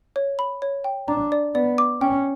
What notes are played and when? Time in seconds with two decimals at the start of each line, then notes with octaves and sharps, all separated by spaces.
0.16 C#5
0.39 B5
0.62 C#5
0.84 G5
1.08 D4 A#5
1.32 D5
1.55 B3 D5
1.78 D6
2.01 C#4 G5